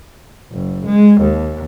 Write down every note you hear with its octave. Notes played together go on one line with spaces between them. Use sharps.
F#1
G#3
D#2